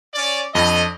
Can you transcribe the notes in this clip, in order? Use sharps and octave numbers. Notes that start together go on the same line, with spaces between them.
C#4 D5
F2 D4 D#5